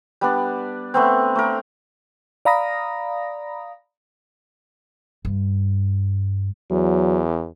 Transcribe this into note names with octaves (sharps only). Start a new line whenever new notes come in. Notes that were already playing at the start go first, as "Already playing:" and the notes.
G3 B3 D4
A3 B3 C4
A3 A#4
D5 F5 A#5 B5 D#6 A#6
G2
E2 F#3